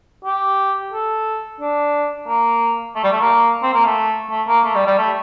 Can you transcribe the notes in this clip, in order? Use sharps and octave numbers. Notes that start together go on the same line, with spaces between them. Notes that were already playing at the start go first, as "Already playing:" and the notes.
G4
A4
D4
A#3
A3
G3
A3
A#3
C4
A#3
A3
A3
A#3
A3
G3
G3
A3